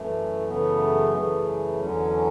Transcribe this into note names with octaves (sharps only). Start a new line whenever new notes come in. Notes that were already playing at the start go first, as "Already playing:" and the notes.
Already playing: F#2 E3 A3
F#2 C#3 E3 A3 B3
F#2 C#3 E3 A3
E2 D3 F#3 C#4